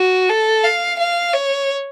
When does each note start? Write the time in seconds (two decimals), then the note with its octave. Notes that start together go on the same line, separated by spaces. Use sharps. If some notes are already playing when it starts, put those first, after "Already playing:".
Already playing: F#4
0.29 A4
0.64 F5
0.99 F5
1.33 C#5